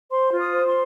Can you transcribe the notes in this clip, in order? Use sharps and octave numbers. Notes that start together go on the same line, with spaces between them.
C5 C6
F4
D#6
C5
C6